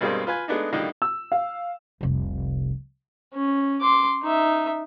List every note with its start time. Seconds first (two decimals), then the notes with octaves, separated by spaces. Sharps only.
0.01 G2 B2 G3 G#3 A#3 C4
0.27 F4 B4 G#5
0.48 G#3 A3 B3 D4 D#4
0.73 A2 D3 D#3 G3 A#3 D#4
1.02 E6
1.32 F5
2.01 F1 C2
3.34 C#4
3.81 C6 D6
4.23 D#4 E5